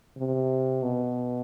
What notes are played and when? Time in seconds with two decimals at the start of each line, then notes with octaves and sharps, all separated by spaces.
0.17 C3
0.82 B2